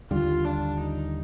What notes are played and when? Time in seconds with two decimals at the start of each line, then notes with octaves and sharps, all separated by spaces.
0.11 D#2 D3 G3 F4
0.45 D4
0.79 D#4